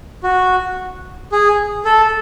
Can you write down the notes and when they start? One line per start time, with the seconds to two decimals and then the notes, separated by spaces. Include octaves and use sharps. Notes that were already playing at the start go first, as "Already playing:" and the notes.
0.23 F#4
1.32 G#4
1.85 A4